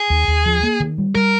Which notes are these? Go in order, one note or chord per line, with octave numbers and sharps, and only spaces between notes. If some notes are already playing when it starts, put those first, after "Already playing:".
Already playing: G#4
D#2
D#2
F3
A#3
D#3
G3
G3 A#4